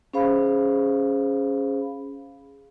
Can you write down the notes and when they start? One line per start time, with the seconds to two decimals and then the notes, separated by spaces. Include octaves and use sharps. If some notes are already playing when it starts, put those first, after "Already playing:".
0.13 C#4 G#4 C5 F5 B5